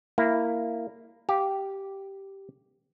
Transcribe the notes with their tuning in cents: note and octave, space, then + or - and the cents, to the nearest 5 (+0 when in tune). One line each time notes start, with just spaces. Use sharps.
A#3 -10 E4 +0
G4 -5 F5 +0